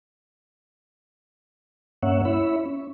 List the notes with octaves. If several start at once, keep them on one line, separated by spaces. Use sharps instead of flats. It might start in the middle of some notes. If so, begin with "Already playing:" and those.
G2 A#3 C#4 C#5 E5 F#5
E4 C#5 E5 B5
C#4